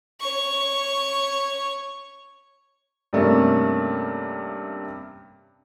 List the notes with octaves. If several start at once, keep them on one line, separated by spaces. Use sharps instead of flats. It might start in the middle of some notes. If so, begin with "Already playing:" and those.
C#5 C#6
G2 C3 A3 A#3 C#4